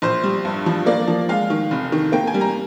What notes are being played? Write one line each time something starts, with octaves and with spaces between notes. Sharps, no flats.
A#1 C5
G3
G2
F3
A#3 D5
F3
G#3 F5
D#3
F1
D#3
A#3 G5
G#5
G3
A#5